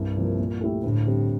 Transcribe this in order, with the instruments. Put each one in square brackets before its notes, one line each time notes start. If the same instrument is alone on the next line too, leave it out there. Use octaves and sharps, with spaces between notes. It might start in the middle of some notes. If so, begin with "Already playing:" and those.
Already playing: [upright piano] C2 [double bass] G2
[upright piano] C3 F3 A#3
A#2
A3 E4 G4
[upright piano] D2 [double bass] A2
[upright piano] D3 G3 C4 G4